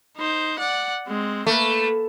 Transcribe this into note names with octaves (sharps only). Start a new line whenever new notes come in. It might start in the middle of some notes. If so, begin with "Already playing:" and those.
D#4 C5
D5 F#5
G#3 C4
A3 A#3 B4